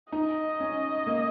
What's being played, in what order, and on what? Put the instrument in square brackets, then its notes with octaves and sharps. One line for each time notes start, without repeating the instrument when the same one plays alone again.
[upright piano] D#4 [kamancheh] D#5
[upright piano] C#4
A#3